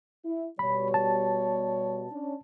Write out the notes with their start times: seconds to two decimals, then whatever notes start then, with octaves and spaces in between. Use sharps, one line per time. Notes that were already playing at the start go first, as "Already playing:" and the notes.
0.25 E4
0.59 B2 G3 C#5 B5
0.94 A5
2.11 C#4 D4